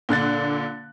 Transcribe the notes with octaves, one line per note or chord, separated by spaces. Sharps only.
A#2 D3 F#6 A6